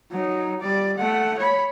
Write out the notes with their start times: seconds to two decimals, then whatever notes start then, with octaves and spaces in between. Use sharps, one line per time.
0.11 F#3 D#4
0.61 G3 D5
0.97 A3 F#5
1.38 C#5 B5